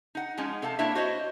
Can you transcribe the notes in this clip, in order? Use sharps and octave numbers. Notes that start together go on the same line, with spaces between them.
D#4 F#5
F3 G#3 C#4 D#4
C3 A4 F5 A5
A#3 D4 E4 C#5 E5
F#4 C5 C#5 D#5